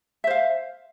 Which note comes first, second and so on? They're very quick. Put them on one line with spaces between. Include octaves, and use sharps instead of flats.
E5 C5 F5